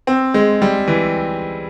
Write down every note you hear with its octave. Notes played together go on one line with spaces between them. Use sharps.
C4
G#3
G3
E3